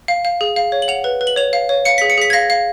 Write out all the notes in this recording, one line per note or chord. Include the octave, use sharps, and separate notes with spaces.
F5
F5
G#4
F5
C#5
F#7
F#5 F7
B4
B4
F#7
C#5 F7
F5
C#5
F5 C#7
G#4 B6
C#7
G#4 B6
G#6
F5 A#6
F5